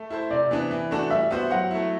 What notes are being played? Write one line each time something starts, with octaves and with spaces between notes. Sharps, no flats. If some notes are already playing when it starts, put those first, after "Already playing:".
Already playing: A3
E4 A4 C5
C3 D5
E3 B3 D4
E3
A3 D4 F#4 A4
G3 E5
B3 F#4 C5 E5
F#3 F#5
A3 E4